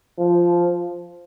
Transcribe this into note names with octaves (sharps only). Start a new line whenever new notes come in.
F3